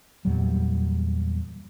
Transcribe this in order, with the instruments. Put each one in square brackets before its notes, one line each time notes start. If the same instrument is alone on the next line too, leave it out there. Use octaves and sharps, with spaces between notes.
[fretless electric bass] E2 A#2 F#3 G3